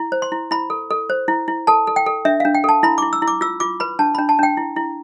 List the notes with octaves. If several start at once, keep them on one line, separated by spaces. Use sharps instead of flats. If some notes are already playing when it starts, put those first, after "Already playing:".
Already playing: E4
C5
C6
E4
E4 B5
A4
A4
C5
E4
E4
A4 A5
A4
G5
A4
D4 E5
F5
D4
G5
A4 A5
E4 B5
D6
E4
E6
E4
D6
F4 E6
F4 D6
B4 B5
D4 A5
B5
D4
A5
D4 G5
E4
E4